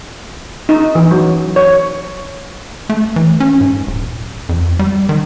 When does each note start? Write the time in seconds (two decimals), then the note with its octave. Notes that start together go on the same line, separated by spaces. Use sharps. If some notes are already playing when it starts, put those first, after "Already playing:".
0.69 D#4
0.95 E3
1.11 F#3
1.56 C#5
2.90 A3
3.16 E3
3.40 C#4
3.61 G#2
3.87 D#1
4.49 F2
4.79 G3
5.09 D#3